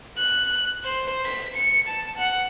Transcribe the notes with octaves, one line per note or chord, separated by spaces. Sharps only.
F#6
C5
B6
C#7
A5
F#5